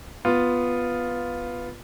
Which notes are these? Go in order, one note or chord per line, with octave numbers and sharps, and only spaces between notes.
B3 F4